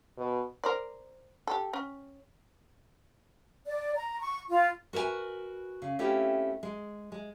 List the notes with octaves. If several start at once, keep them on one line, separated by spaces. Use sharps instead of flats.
B2
A#4 C5 D5
G4 A4
C#4
D5
A#5
C#6
F4
F#4 A#4 B4 D#5 G#5
C#3
A3 C4 C#4 E4 F4 G4
G#3
G#3